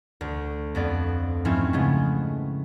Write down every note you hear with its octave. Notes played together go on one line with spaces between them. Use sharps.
D2
F2 B3 D5
G#2 F3 A3 C4 C#4 E4
C#3 G#3 A3 B3